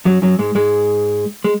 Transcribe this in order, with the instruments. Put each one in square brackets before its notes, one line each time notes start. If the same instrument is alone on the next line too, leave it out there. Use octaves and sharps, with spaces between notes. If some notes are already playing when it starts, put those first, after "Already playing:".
[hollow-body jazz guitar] F#2 F#3
F#2 F#3
G#2 G#3
G#2 G#3
G#3